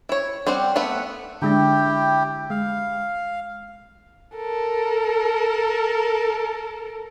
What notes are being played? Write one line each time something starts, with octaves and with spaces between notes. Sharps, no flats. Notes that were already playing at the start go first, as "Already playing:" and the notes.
E4 C#5
G3 C4 C5 F#5
A3 B3 E5 F#5
D3 G#3 D4 E4 G4 G5
G#3 F5
A4 A#4